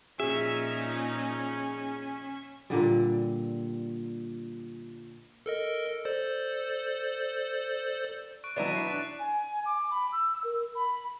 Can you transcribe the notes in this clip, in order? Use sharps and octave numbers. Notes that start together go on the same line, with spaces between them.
A#2 F3 C#4 D#4 G#4 E5
A#2 D3 G3
A4 A#4 D#5
A4 C5 D5
C#6 F#6 D7
B2 F#3 D4 E4 A#5 A6 D#7 E7
B6 C7
D4 F#6
G#5
D6
B5
E6
A#4
B5